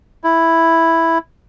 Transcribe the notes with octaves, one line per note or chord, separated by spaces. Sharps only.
E4